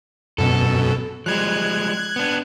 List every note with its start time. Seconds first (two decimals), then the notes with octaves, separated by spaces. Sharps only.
0.38 F#2 B2 A4
1.26 F3 G3 G#3 F#6 G#6
2.16 B3 D4